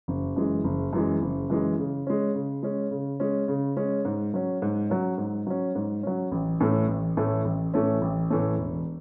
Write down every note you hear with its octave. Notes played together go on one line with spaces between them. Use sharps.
F#1
F#2 E3 G#3
F#1
F#2 E3 G#3
F#1
F#2 E3 G#3
C#3
G#3 C#4
C#3
G#3 C#4
C#3
G#3 C#4
C#3
G#3 C#4
G#2
F#3 C#4
G#2
F#3 C#4
G#2
F#3 C#4
G#2
F#3 C#4
A1
A2 E3 A3 C#4
A1
A2 E3 A3 C#4
A1
A2 E3 A3 C#4
A1
A2 E3 A3 C#4
E1